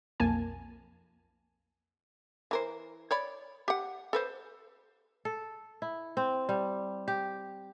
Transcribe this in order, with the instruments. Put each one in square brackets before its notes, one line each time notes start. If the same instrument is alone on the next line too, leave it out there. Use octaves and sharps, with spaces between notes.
[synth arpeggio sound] B1 F2 A#3 G#5 A5
[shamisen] E3 A#4 C5
C#5 D5 B5
G4 F#5
A4 B4 C5
[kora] A4
E4
C4
G3
G4